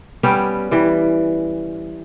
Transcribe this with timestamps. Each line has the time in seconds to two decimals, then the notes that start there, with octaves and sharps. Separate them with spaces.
0.23 G3 B3 C#4 G4
0.71 E3 G3